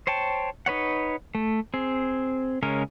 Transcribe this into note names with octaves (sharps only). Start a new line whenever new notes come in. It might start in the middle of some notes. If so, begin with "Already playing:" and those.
C5 C#5 G5 A5
D#4 B4 C#5 F#5
A3
C4 G#4
C#3 G#3 C#4 A#4 C#5